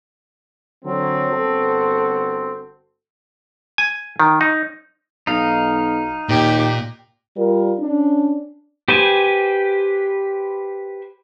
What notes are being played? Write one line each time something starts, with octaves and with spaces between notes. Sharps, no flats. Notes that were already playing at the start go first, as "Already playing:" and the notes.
D3 F#3 C4
G1 F#4 A4
G#5
D#3
D#4
B1 D#4 F5
D#2 A#2 G4
G3 F4 A#4
C#4 D4
G4 B4 C5 G5 G#5